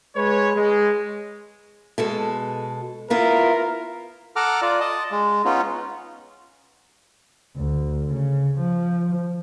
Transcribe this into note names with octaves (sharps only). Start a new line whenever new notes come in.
G#3 B4 C#5
G#3
B2 G#3 A4
B3 E4 F4 A#4
A4 F#5 A#5 D6 F6
F4 D5
D#5 A5
G#3
B3 C#4 D#4 F4
D2
C#3
F3